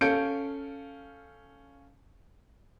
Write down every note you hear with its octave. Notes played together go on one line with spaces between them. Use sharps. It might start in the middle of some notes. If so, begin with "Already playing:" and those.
C#4 A4 F5 G6 C#7 D7